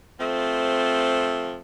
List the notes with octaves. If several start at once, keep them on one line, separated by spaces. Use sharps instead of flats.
F3 A3 C4